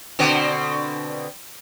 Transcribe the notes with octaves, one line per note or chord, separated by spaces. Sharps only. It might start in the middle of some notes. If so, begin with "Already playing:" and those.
B2 D3 C4